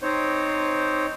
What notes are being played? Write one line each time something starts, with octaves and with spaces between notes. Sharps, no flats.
C4 D#4 C5 C#5